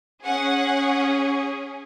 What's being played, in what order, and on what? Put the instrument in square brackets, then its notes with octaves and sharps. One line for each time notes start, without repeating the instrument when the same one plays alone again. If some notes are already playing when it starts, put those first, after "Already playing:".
[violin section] C#4 G#4 F#5